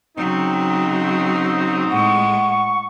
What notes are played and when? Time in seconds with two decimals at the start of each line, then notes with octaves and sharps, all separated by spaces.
0.17 C#3 F#3 C4 D#4
1.90 A2 G#3 F#5 C#6